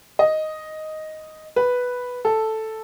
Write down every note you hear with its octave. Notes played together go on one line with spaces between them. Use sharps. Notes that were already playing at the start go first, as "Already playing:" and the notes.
D#5
B4
A4